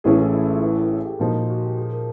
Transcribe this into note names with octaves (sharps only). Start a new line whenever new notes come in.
A1 A2 E3 A3 C#4 G#4
A4
E4
F4
B4
A4
G#4
G4
A#2 F3 A#3 D#4 F#4
F4
F#4
G4
G#4
A#4